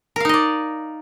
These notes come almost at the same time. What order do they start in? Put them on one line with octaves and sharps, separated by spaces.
A#4 F5 D#4 D#5 D5